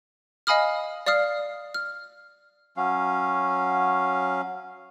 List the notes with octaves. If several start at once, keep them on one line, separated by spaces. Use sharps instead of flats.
D#5 F5 G#5 B5 D#6 F6
D5 F5 D#6 F6 C7
F6
F#3 C#4 F5